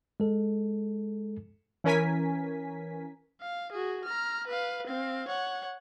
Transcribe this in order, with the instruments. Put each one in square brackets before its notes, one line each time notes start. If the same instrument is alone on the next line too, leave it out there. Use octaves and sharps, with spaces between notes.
[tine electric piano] G#3 A4
[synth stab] E3 C#4 A#4 G#5 B6
[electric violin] F5
F#4 G#4
A#5 F6
B4 F5
C4 F5
C#5 F#5